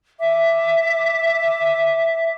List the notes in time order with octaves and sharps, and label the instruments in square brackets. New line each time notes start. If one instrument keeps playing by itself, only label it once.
[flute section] E5 D6